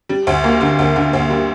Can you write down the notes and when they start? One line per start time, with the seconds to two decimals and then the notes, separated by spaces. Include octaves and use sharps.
0.09 G3
0.27 D2
0.44 A#3
0.61 D3
0.79 D2
0.96 D3
1.13 D2
1.30 G3